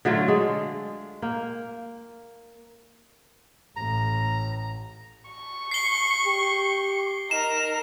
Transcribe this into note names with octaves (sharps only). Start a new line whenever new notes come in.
D3 F#3 A3 F4
G#3
A#3 G5
A1 A2 A#5
C#6
C7 G7
G4
D#4 A#4 E7